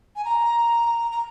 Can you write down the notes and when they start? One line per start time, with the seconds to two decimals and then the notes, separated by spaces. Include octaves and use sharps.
0.16 G#5
0.24 A#5
1.11 A#5